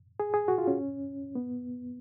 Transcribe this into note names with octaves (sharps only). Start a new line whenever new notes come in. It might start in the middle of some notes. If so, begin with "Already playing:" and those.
G#4
G#4
F#4
F4
C#4
B3